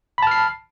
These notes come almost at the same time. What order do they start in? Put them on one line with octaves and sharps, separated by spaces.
B5 A5 F6 C7